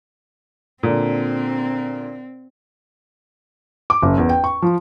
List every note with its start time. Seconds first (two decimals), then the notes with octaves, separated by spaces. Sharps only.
0.83 A#2 D3 C4
3.90 D6
4.02 F#1
4.18 E2
4.29 G5
4.44 C#6
4.62 F3